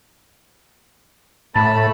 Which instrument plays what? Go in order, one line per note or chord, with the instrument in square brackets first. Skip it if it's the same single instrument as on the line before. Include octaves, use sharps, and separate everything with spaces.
[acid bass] A2 [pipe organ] A3 [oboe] A5 [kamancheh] B5